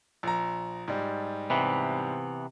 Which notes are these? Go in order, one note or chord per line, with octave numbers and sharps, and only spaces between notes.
A#1 A#5
G#2 G3
C3 E3 B3